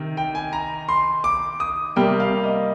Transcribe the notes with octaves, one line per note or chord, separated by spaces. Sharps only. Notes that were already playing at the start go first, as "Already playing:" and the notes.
Already playing: C3 D#3
G5
G#5
A#5
C6
D6
D#6
C3 G3 A#3 G5
F5
D#5